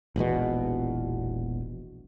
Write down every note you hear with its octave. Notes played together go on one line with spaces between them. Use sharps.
E1 A#1 E2 B2